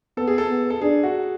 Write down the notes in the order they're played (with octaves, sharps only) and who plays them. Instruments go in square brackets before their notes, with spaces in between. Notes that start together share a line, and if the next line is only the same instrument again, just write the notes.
[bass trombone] B3 [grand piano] A4
[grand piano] G#4
A4
[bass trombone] B3
[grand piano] A4
[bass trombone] D4 [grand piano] G#4
[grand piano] F#4